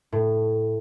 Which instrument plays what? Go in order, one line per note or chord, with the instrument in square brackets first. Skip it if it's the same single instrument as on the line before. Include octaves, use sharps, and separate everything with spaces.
[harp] A2